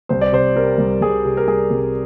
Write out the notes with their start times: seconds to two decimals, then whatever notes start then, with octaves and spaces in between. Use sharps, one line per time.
0.09 C2 C5
0.21 D5
0.32 C3 C5
0.56 G3 A#4
0.78 C2
1.01 C2 G#4
1.25 C3
1.37 A#4
1.47 G3 G#4
1.70 C2